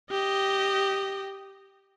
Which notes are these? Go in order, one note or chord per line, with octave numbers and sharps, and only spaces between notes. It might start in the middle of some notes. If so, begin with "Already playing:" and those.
G4 D#5